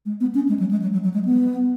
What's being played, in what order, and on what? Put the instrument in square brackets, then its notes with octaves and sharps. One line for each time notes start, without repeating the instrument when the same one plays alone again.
[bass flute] G#3
B3
C#4
G#3
F#3
G#3
F#3
F#3
F#3
G#3
B3